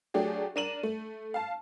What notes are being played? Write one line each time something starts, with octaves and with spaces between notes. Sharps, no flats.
F#3 A3 D4 G4 G#4
D4 A#4 D#7 E7 F#7
A3
F5 A5